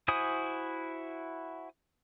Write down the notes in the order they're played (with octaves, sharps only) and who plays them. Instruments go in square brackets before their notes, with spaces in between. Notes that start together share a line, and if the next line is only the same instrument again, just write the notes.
[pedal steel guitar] E4 F#4 C5 G#5 D#6